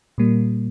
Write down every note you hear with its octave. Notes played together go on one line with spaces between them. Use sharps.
A#2 G3 A#3